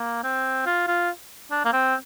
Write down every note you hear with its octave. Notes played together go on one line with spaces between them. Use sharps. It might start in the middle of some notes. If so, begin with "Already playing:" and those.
Already playing: A#3
C4
F4
F4
D4
A#3
C4